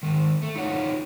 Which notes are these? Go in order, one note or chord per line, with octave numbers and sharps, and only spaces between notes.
D#3 G#3
A3
D#4 F4 F#4 C#5 F#5